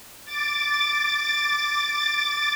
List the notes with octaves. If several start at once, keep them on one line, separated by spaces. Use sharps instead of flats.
D6 A6